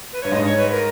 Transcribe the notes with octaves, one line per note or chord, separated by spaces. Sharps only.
B4
G2 C#5
G#2 D#5
C#5
B4
A#4